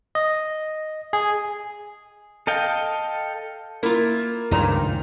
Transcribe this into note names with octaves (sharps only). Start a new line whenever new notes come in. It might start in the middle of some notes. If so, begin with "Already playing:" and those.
D#5
G#4
A4 D#5 F5 G5
A#3 E4 F4
C#2 G2 A#2 D#3 F3 A#5